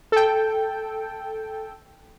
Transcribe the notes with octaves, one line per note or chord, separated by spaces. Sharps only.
A4 G5